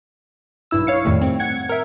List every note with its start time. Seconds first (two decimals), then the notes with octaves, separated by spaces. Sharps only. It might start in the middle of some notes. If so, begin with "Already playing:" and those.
0.71 B1 G2 E4 E6
0.87 C#5 F5 C#7
1.05 F2 A2 D#3 G3 A3
1.21 C4
1.39 F#5 G#6 C#7
1.69 A#4 E5